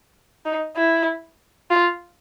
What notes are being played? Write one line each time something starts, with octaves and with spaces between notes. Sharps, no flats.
D#4
E4
F4